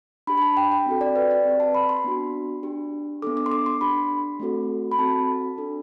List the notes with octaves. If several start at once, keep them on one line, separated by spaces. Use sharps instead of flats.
D4 G4 B5
B5
A5
G5
G5
C4 F#4 A4
D5
B4
D5
C4 G4
A5
B5
C6
B3 D4 F#4
D4 G4
B3 D4 A4 D6
D6
C6
D6
C6
D4 G4 B5
A3 C4 F#4 A4
B5
C4 F#4 A4 A5
D4 A4